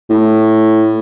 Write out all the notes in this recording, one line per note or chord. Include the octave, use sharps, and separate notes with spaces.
A2